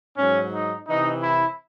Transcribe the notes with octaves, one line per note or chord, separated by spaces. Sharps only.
G#2 F#3 C#4
D#4
C3 E3 D#4
E4